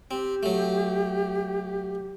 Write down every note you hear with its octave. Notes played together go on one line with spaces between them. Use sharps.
C4 G4
F#3 A3